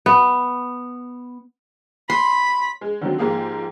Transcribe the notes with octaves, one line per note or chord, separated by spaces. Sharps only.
B3
B5 C6
G#3
D3 D#3 F#3 C4
G#2 F3 A#3 G4 G#4